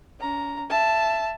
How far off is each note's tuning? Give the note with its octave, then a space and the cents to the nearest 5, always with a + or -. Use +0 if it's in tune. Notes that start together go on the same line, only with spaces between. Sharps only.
C#4 +40 A#5 +0
E5 +20 A5 +0